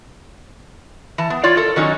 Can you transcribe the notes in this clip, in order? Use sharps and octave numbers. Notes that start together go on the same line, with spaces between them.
E3 A5
B3
F4 C#5 D5
A4 A#4
D#3 F#3 C#4 D#4